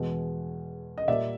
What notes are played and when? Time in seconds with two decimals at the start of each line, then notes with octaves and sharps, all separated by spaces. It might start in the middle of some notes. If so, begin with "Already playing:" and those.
Already playing: E2 B2 G#3
0.98 D#5
1.08 A#2 G3 A#3 D5 E5